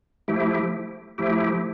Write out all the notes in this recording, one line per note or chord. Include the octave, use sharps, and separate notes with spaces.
F3 A3 E4 G4
F3 A3 E4 G4